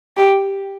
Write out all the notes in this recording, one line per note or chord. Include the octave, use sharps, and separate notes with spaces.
G4